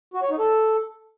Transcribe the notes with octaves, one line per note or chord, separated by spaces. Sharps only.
F#4
C#5
D#4
A4